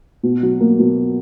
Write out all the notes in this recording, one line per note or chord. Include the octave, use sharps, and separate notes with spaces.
B2
F#3
A#3
B2